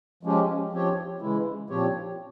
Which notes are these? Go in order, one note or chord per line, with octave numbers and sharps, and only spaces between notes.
F3 G#3 C#4 G4
F3 C4 G4 C#5
C#3 E3 G#3 E4
A#2 F3 C4 G4 C#5